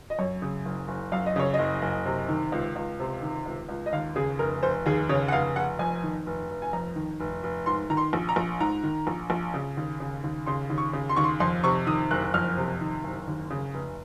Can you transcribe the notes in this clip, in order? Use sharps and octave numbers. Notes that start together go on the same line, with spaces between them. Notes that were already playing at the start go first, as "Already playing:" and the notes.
D#5
F#2 C#5
C#3
F#1
F#1
F#2 F5
D#5
C#3 C#5
D#5
F#1
F#1
C3
D#3
C#2
C#2
C3
D#3
C#2
C#2
D#5
D#2 F5
C#3 G#4
F1 A#4
F1 C5
D#2 G#4
C#3 C#5
F#5
F1 F5
F1 F#5
F2 G#5
D#3
F1
F1
G#5
F2 A#5
D#3
F1
F1
G#2 C6
D#3 A#5
C6
A#1
A#5
A#1
G#2 A#5
D#3
A#1
A#1
C#3
D#2
C#3
D#2
C#3 C6
D#2
C#6
C#3
C6
D#2 C#6
C6
F2 C6
C3 C#6
D#3 D#6
F#1 F#6
F2 F6
C3
D#3
F#1
D#2
C#3
F1